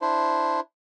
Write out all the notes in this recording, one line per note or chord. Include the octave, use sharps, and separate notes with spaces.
D4 E4 C5